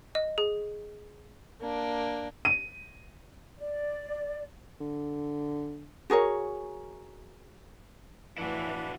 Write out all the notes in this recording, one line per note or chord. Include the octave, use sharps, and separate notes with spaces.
D#5
G#4
A#3 D4
D#7
D5
D3
F#4 G#4 A#4 C#5
F2 A2 E3 D4 E4 F#4 B4